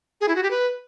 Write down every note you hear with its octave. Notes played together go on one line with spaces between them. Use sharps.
G#4
E4
F#4
G4
B4